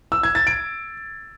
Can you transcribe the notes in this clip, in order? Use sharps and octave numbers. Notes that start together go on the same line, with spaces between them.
E6
G#6
A6
D7